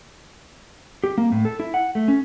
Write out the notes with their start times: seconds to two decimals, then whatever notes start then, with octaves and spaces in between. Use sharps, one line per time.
1.04 G4
1.18 A#3
1.32 A2
1.45 A4
1.60 E4
1.74 F#5
1.95 A3
2.08 C#4